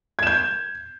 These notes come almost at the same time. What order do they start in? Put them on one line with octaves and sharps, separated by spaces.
G#6 E7 G6